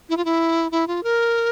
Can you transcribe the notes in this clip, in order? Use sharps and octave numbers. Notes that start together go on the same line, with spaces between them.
E4
F4
E4
E4
F4
A#4